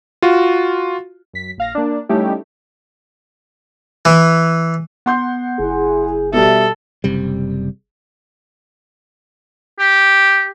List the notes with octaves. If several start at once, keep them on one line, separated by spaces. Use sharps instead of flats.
F4 F#4
F#2 B6
A#1 F5 A#6
A#3 D4
G3 A3 C#4 D#4 E4 G4
E3
B3 F#5 C6 G6
F#1 E4 G#4
B2 G3 A4 E5
F#1 C3 G3
G4